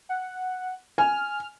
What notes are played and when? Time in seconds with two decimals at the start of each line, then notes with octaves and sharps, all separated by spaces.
0.09 F#5
0.98 G#5 F6